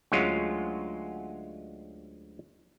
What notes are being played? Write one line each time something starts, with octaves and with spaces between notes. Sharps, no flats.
D2 F#3 G#3 C#4 F4